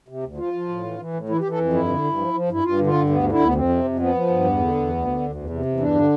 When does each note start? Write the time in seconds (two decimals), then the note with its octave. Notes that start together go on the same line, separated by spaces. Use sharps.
0.08 C3
0.23 D2
0.38 F3 F4
0.53 F3
0.69 A2
0.84 E3
0.98 E3
1.13 A2
1.29 E3 E4
1.40 G4
1.44 E3
1.51 A4
1.59 F2
1.73 G2 E4
1.88 D3
2.04 G2
2.18 F3
2.34 F3
2.49 G2 E4
2.64 G2 F4
2.79 D3
2.87 F4
2.94 G2
3.09 D2 B3
3.24 D3
3.32 E4
3.40 D2
3.45 B3
3.54 F2 C4
3.69 C3
3.84 F2
3.99 F3 B3
4.14 F3
4.29 G2
4.45 E2
4.60 D3
4.74 E2
4.90 D2
5.05 D3
5.20 D2
5.35 E2
5.50 C3
5.65 E2
5.80 G2 D4
5.95 D3